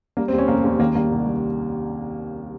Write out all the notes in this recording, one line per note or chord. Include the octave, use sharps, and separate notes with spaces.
G3 A#3
C4
D#2
C#4
F1 A#3
D#2 A#3
D#3 A#3
G3 A#3
C2
G3